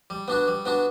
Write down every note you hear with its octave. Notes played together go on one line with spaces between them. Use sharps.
G3
B3 D4 F#4
G3
B3 D4 F#4